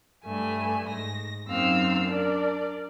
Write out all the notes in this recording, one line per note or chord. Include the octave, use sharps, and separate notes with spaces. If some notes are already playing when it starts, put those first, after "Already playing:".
G2 A3 E5 G#5
G#2 A#6
F#2 A#3 C4 D#4 F5 E6
D4 A#4 D5